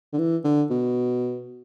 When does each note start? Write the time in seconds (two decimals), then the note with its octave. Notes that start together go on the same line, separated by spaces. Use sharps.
0.13 D3
0.18 E3
0.44 D3
0.70 B2